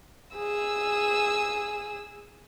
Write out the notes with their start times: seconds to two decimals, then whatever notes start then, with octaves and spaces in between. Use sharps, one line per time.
0.37 G#4 E6